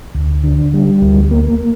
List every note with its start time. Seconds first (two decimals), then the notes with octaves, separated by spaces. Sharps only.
0.15 D2
0.43 D3
0.73 G3
1.02 D2
1.31 A#3